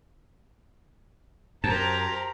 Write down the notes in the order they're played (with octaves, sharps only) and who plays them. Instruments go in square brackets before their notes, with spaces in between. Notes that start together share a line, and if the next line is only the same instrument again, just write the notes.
[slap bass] F#2 [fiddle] G4 A#4 [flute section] C5 A#5 [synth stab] A5